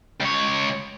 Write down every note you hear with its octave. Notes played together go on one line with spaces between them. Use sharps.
C#2 C#5